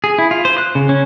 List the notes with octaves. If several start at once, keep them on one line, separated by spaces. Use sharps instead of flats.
G#4
E4
F4
C5
F#6
C#3
C#4